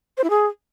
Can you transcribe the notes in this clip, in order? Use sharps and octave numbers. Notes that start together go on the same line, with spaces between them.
C5
E4
G#4